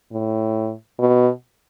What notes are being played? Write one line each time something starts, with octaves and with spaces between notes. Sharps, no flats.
A2
B2